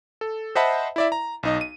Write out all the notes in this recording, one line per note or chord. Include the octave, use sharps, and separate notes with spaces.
A4
C5 D#5 E5 F#5 A5 B5
E4 D5 E5
A#5
B1 D#4 D#5
D#7